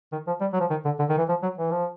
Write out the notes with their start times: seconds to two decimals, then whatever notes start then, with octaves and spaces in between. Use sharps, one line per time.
0.12 D#3
0.27 F3
0.41 G3
0.53 F#3
0.60 F3
0.70 D#3
0.85 D3
0.99 D3
1.09 D#3
1.18 E3
1.29 F3
1.43 F#3
1.58 E3
1.71 F3